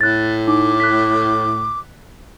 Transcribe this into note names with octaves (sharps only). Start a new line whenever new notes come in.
A2 F#6 A6
D#4 D6
F#6 B6